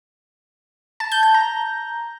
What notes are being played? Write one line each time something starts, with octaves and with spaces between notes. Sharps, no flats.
A5
G6
G6
A#5